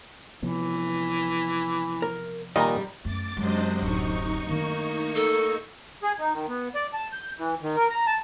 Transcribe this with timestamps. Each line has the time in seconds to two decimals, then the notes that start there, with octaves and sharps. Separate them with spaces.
0.43 C3 E3 F3 B3
2.02 A#4
2.56 A#2 D#3 G3 D#5 A#5
3.05 F#2 A3 D6 A6
3.37 F#2 C3 G#3 D4 C5 D#5
3.82 D1 D#4 C#6
4.45 D#3 A3 A#3 D4
5.15 A4
6.03 G#4
6.19 D#4
6.34 D#3
6.48 B3
6.75 D5
6.93 A5
7.12 G6
7.39 E3
7.63 D#3
7.76 A#4
7.90 A#5
8.07 A5